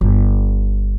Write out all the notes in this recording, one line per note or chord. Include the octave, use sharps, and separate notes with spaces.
G1